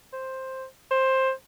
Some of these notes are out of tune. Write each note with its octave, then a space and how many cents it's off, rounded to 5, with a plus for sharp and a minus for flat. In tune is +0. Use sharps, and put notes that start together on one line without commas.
C5 +5
C5 +15